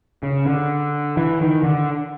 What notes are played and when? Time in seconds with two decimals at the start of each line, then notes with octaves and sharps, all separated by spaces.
0.23 C#3
0.46 D3
1.17 E3
1.41 D#3
1.63 D3